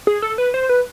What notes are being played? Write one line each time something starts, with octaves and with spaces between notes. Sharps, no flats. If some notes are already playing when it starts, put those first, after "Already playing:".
G#4
A4
B4
C5
B4